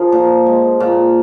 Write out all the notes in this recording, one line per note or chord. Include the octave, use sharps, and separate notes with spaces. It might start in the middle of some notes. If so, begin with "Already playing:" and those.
Already playing: F3 F4 G#4 A#4
A#2
G#3
A#2